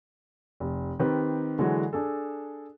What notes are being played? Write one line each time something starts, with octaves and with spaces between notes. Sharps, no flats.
F1
D#3 C4 G4 B4
D3 E3 F#3 G#3 F#4
D4 G#4 A4